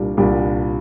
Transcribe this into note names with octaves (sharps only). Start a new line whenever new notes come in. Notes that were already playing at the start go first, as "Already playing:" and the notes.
Already playing: C2 A#2 G3 D4 G4
C2 A#2 G3 D4 G4